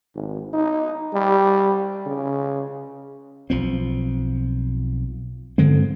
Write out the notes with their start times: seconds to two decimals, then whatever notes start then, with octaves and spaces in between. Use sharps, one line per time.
0.15 G#1
0.53 D#4
1.14 G3
2.06 C#3
3.50 B1 F3 C4
5.58 G2 D3 G#3 C4